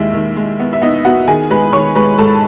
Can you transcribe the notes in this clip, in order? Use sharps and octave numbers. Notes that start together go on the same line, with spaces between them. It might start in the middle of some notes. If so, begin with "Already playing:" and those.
Already playing: D#2 D#3 G#3 E4 E5
D#3
G#3
B3
E5
B3 D#4 D#5
B3 F#4 F#5
D#3 G#4 G#5
G#3 B4 B5
D#3 C#5 C#6
G#3 B4 B5
G#2 A4 A5